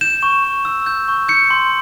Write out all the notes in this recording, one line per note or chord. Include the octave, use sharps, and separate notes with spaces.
G6 E7
C#6
C#6
E6
G6
C#6
G6 C#7
C6